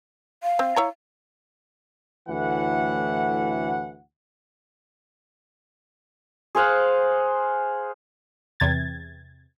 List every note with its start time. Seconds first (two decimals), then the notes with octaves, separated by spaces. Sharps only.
0.43 F5
0.59 C4
0.76 E4 C#5 A#5
2.28 D2 A2 E3 F#5
6.55 G#4 C5 F5 F#5
8.60 E2 C3 G#6 A6